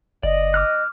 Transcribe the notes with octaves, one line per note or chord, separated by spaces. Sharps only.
F#1 D5 D#5
D6 F6 F#6